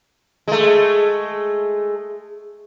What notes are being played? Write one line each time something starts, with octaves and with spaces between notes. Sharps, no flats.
G#3 A3